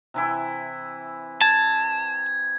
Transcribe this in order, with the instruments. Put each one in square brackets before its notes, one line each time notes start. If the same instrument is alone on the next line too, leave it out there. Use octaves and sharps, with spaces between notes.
[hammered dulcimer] C3 E3 E4
[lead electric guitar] A5 [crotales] G#6